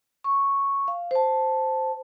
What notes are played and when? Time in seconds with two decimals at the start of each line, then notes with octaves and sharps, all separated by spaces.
0.24 C#6
0.88 F5
1.11 C5 A5